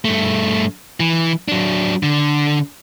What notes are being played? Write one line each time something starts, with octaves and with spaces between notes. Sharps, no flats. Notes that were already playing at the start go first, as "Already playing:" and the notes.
G2 A3
E3
F#3 D4
D3